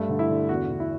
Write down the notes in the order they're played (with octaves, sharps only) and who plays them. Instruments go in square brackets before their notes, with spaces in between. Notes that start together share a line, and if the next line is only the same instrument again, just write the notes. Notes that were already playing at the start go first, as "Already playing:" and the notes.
Already playing: [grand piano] G2 A3
D3
E4
D3
E2 F#4
D3
E4